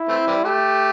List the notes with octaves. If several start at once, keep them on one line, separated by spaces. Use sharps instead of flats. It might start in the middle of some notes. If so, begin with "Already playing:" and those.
Already playing: E4
E3 A3 C4
C3 E3 G3
A3 G4